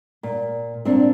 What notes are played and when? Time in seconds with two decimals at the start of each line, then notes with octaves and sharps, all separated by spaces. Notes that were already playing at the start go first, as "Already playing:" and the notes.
0.23 A#2
0.85 A#2 C4 D4